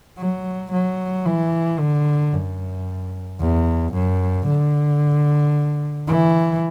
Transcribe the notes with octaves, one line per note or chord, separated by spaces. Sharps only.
F#3
F#3
E3
D3
F#2
E2
F#2
D3
E3